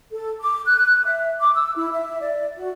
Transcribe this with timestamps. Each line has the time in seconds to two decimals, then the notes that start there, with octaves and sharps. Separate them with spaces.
0.12 A4
0.41 D6
0.66 F#6
1.05 E5
1.39 D6
1.54 E6
1.77 E4
1.91 E5
2.19 D5
2.56 F#4